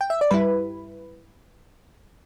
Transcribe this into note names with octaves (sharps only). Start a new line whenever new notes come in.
G5
E5
D5
G2 G3 E4 B4